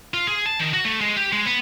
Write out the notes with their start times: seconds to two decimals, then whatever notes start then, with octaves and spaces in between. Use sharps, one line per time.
0.14 F4
0.27 G#4
0.46 A5
0.59 D#3
0.73 F#4
0.85 A3
1.01 G#3
1.17 G4
1.32 G#3
1.46 B3